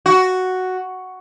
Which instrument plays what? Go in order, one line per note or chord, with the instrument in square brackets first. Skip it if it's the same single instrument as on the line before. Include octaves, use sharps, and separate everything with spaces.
[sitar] F#4